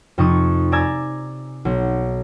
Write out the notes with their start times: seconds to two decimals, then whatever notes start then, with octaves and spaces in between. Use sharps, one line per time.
0.18 F2 C3 D#4 C#6 D#6
0.72 D5 G#5 A#5 E6 G#6
1.65 B1